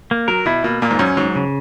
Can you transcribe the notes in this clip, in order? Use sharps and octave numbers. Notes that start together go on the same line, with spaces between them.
A#3
F#3 A#4
B2 E4
B2 A#3
A#2 A#3
G#2
F#2 C#4
G#2 F#3
C#3